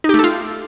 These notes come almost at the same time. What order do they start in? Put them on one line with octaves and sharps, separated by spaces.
D#4 G4 A3 A4 F4